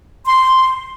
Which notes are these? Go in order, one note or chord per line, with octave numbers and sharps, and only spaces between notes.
C6